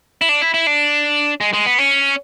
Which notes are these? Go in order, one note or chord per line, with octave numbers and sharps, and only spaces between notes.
E4
D4
E4
E4
D4
G#3
G#3
B3
C#4